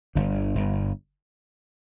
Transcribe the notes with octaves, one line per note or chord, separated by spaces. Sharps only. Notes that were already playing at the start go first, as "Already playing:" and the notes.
G1 D3
G1